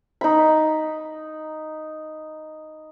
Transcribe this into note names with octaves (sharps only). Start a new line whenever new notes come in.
D#4 B5